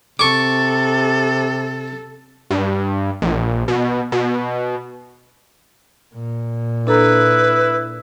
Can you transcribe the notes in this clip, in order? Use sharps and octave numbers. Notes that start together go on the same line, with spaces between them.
C3 A4 C#6 D6
G2
A#1
B2
B2
A#2
D4 E4 A4 B4 A#5